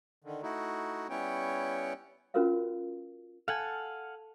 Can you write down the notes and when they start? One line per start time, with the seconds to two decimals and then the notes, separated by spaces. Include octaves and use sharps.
0.24 D3 D#3
0.43 A3 D#4 E4 F#4
1.10 G3 B3 C#4 E4 C#5 G5
2.34 C#4 F4 F#4 A#4 B4 F5
3.48 A4 F5 F#5 G#5